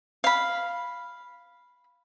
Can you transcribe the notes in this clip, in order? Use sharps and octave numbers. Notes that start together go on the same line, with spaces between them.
F5 B5